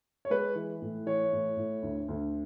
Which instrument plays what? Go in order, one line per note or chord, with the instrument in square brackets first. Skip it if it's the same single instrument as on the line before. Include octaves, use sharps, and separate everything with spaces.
[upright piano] C#5
G#3 B4
E3
A2
E3 C#5
A2
A2
D2
D2